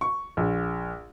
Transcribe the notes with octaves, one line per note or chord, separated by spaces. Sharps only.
C#6
A#1